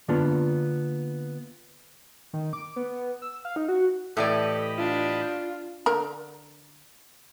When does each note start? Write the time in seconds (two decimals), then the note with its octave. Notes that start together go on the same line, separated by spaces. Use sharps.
0.08 D3 A#3 B3 D4 F4
2.33 D#3
2.53 D6
2.76 B3
3.22 E6
3.45 F5
3.56 D#4
3.68 F#4
4.17 A2 E3 G4 A4 D5 D#5 B5
4.78 D4 F4
5.86 D3 A#4